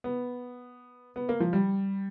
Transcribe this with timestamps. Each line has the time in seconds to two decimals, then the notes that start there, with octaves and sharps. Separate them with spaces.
0.04 B3
1.16 B3
1.29 A#3
1.40 F3
1.53 G3